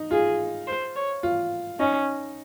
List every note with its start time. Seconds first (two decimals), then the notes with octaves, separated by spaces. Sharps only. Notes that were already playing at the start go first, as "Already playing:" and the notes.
Already playing: D#4
0.11 F4 G#4
0.67 C5
0.96 C#5
1.23 F4
1.79 C#4 D#4